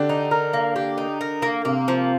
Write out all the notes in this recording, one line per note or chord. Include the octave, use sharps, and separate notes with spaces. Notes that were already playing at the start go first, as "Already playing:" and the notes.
Already playing: D3 D4 G4
D#4
A#4
A#3
G4
D#4
A#4
A#3
C3 A#3 C4
F3